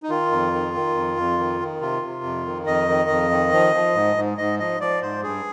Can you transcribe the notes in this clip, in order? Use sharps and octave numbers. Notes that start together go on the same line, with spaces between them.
D#4
D#3 F4
F2
D#3
D#3
F2
F2
D#3
D#3
C3 F4
C3
F2
D#3
F2 D#5
D#3
F2
D#3
F3
F3
G#2
G#2
G#2 D#5
F3 D#5
F3 D5
G#2 C5
G2 G#4